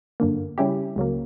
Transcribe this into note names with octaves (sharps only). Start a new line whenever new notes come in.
G1 F#2 D3 A#3
C#3 G3 C#4 E4 G4
C#2 C#3 F#3 A#3